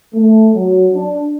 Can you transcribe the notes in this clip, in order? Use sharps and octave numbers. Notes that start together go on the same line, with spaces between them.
A3
F#3
D4